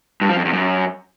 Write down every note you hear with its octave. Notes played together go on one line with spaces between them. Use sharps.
G2
F3
F2
E2
F#2